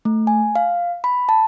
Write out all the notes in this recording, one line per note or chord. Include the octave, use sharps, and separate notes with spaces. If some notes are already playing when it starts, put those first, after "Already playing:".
A3
G#5
F5
B5
A5